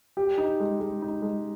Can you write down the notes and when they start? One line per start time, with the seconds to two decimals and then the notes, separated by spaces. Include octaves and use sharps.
0.17 G4
0.38 D#4
0.60 G#3
0.80 G#3
1.02 D#4
1.22 G#3